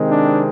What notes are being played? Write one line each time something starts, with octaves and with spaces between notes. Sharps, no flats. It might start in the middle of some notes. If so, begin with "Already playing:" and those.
Already playing: C3 D#3 G#3 C4
D4